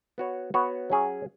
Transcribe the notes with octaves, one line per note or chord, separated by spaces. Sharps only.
B3 F#4 C#5
B3 F#4 C#5
F#3 C#4 G#4